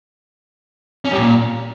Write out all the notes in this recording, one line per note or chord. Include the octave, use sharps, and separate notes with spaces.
C#4
G3
A#2